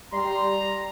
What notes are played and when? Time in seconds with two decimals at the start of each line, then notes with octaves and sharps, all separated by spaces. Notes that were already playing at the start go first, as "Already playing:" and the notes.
0.13 G3 D5 A#5 C6